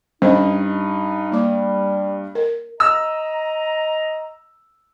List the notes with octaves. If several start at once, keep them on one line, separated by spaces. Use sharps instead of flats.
G2 C#4 D#4 C5 D#5
G3 A#3 D6
A#4
D#5 A#5 E6